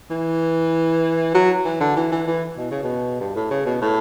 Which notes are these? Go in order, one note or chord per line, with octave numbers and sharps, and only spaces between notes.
E3
F#3
E3
D3
E3
E3
E3
B2
C#3
B2
G2
A2
C#3
B2
A2